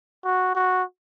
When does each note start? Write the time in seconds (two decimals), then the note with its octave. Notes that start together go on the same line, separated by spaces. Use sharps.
0.25 F#4
0.55 F#4